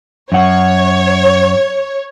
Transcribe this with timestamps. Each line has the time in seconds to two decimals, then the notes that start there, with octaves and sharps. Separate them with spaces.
0.32 F#2 C#5 F#5